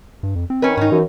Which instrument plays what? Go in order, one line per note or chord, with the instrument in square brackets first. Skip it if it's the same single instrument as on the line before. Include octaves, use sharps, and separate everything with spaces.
[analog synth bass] G2
F2
C4
[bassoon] D#3 [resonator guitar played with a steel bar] C#4 B4
[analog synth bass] G#2 [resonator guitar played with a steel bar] C#4 D#4
[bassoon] F#2 [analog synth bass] E3